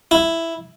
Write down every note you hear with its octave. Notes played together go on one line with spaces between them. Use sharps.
E4